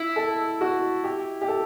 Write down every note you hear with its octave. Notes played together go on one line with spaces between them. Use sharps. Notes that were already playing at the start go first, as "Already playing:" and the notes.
Already playing: E4
A4
F#4
G4
G4
A4